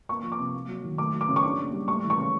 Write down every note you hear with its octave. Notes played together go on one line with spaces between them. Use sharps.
A#3 C#6
F3
D6
C3
A#3
F#3
D#3
A3 D6
F#3
D6
C#3
C#6
D4 D6
A#3
G3
A3 C#6
E3
C#6
C#3